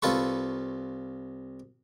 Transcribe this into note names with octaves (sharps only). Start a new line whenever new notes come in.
C2 F4 A4 B4 C#6